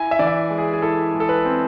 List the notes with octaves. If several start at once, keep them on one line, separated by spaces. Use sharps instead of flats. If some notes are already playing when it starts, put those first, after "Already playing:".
Already playing: E4 G#5
E5
E3 D5
E5
G#3
G#4
G#4
E4 A4
G#3
A4
B4
C4